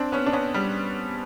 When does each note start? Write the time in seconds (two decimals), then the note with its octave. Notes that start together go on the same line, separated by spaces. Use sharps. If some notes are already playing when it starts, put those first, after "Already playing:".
Already playing: C4 D4
0.12 B3 C#4
0.26 D4
0.33 B3 C#4
0.54 G3